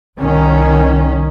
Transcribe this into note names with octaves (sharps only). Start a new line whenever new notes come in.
C2 D#3 C#4